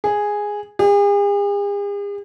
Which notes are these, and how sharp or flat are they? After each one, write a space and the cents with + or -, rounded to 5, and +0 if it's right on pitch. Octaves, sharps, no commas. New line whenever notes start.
G#4 -5
G#4 -45